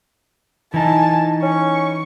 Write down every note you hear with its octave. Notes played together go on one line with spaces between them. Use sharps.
E3 D#4 G#5 A5
C#4 C#6